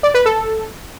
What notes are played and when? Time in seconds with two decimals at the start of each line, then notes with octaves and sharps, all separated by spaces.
0.03 D5
0.14 B4
0.26 A4